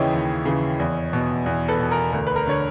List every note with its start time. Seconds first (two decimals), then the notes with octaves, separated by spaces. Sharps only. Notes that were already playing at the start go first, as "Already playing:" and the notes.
Already playing: D#2 C#3 E3 C#5 D#5 E5 G5
0.12 D#2
0.45 C#3 E3
0.79 E2
1.13 B2
1.46 E2
1.68 A4 B4
1.80 B2
1.91 A#4
2.13 D2 A#4
2.27 B4
2.36 A#4
2.47 D3 C#5